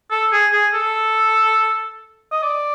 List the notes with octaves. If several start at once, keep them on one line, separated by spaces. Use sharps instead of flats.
A4
G#4
G#4
A4
D#5
D5